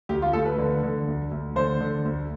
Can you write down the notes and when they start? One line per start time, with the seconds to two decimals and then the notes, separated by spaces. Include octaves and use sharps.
0.09 D2 G4
0.22 F4
0.33 D2 A4
0.45 B4
0.58 D3
0.83 D3
1.07 D2
1.31 D2
1.56 D3 C5
1.81 D3
2.05 D2